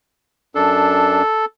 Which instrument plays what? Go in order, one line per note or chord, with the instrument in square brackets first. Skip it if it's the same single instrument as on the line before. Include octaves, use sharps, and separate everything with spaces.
[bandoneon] F#2 D4 [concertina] A4